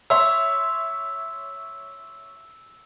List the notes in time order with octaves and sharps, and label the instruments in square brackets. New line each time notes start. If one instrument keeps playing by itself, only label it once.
[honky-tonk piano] C#5 E5 C6 [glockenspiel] E6